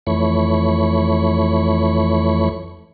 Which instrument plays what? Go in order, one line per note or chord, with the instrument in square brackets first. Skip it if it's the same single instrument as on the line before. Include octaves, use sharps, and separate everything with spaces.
[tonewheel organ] F2 E3 A3 C#5 B5 C#6